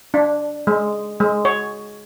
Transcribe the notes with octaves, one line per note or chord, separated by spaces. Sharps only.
D4
G#3
G#3
C#5